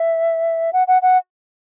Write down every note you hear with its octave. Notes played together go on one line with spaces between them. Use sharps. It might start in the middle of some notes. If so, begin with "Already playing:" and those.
Already playing: E5
F#5
F#5
F#5